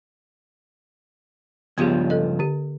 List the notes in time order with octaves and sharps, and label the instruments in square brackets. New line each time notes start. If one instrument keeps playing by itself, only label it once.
[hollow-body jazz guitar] C#2 G2 F3 [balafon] B3 G4 G#4
[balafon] A4 D#5
D3 G4